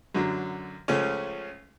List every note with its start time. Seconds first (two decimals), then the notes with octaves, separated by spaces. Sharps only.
0.15 F#2 D3 F#3
0.88 C#2 C#3 F3 A3 C#4